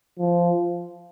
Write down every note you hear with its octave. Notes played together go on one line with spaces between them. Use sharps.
F3